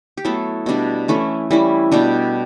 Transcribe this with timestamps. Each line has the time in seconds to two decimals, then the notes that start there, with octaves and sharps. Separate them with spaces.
0.17 G4
0.25 F#3 A3 B3 E4 A4
0.66 B2 G3 D4
1.08 E3 A3 C#4 E4
1.50 E3 G3 C#4 E4
1.91 B2 G3 D4 G4